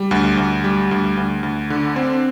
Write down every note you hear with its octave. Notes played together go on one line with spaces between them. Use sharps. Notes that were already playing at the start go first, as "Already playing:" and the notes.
Already playing: G3
D2
D2
G3
D2
D2
D2
D3
C4